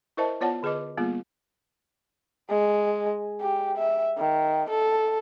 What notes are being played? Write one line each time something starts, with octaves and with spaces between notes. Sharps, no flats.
E4 A#4 C5 D#5 E5 A5
B3 F4 C#5 D5 F#5 A5
D3 G#4 B4 D#5 D6
G3 A#3 B3 F4 G#4
G#3
G4
E5
D#3
A4